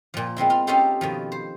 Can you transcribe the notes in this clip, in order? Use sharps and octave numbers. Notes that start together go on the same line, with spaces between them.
A#2 F3
G#3 B3 C4 E4
F4
C#4 D#4 F4 G4 A4 C5
B2 D#3 F3
C5